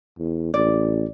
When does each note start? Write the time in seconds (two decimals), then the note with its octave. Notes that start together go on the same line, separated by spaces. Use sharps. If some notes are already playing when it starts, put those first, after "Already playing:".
0.19 E2
0.54 A1 D5